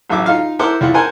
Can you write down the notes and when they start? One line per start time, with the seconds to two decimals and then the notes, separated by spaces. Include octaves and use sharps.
0.10 A1 F#3 E5 D6
0.26 D#4 F4 F5
0.59 E4 A#4 C5 F#5 C6 D6
0.81 C2 E4 F4 F#5
0.94 A#4 C5 F#5 G#5